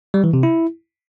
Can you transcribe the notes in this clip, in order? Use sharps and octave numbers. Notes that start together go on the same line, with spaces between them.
G3
E3
C3
E4